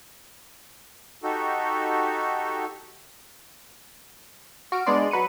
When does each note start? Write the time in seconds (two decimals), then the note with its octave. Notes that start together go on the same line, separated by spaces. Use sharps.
1.23 D#4 F#4 G4 A4
4.72 F#4 F6 D7
4.86 G#3 B3 D4 D5 C6
5.11 F#3 B4 C#7 D#7